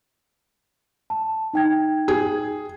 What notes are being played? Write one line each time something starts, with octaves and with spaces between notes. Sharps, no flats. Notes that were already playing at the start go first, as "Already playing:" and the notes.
A5
D#4 G5 G#6
G#4